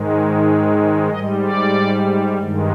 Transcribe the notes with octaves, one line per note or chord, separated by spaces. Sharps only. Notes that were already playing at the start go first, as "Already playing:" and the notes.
Already playing: G#2 D#3 G#3
G#2 G3 D#5
D5
G2 D#3 G#3